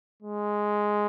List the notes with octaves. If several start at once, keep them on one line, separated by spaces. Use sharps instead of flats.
G#3